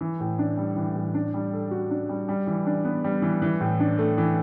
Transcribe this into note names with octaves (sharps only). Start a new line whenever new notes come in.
E3
A2
D4
G3
E3
A2
D4
G3
A4
F#4
D4
G3
G3
E3
D4
B3
G3
E3
E3
A2
D4
A3
E3